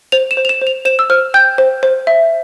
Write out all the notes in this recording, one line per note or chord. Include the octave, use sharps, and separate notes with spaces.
C5 F7
E7
C5
F7
E7
C5
F7
C5 E7
E6
C5 F6
G5 G6
C5
C5
E5